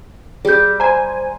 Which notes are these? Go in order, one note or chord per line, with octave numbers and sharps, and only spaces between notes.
G3 G4 G#4 G6
C5 G#5 A#5